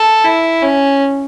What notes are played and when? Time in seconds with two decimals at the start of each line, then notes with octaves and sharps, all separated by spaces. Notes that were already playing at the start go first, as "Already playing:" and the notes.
Already playing: A4
0.25 E4
0.62 C#4